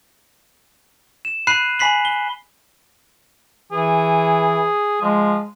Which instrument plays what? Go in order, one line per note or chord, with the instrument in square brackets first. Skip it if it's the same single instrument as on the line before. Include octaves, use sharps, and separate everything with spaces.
[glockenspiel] E7
B5 F#6 C7 D#7
G#5 B5 B6 C7 F#7
G7
[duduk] E3 [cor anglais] G#4
[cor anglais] F3 [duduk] G#3